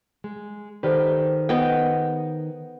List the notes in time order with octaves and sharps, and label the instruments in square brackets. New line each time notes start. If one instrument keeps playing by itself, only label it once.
[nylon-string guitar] G#3
[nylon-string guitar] D#3 G4 B4 [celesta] A4 C5 D5
[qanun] B3 D#5 G5